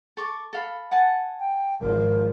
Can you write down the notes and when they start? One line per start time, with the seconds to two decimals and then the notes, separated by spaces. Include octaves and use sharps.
0.17 A4 C#6 D6
0.53 A4 F5 B5
0.91 F#5 G#5 A5
1.39 G5
1.81 G#1 F3 A#4